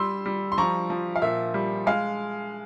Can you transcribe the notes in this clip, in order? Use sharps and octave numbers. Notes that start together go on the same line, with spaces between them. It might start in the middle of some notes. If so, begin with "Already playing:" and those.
Already playing: G3 C6 E6
G3
C6
F3 A#5 C#6
F3
F5
A#2 E5
G3
G#3 F5